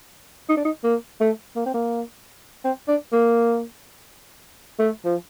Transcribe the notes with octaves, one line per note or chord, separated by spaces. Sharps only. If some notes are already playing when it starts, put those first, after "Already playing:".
D#4
D4
D#4
A#3
A3
A#3
C4
A#3
C4
D4
A#3
A3
F3